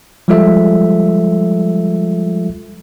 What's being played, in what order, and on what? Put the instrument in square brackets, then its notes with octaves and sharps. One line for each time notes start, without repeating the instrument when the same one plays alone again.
[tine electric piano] F3 G3 G#3 F4 A4 E5